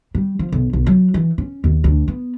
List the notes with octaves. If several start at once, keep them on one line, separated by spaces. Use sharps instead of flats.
G3
F3
B1
B1
F#3
E3
C#4
D#2
D2
B3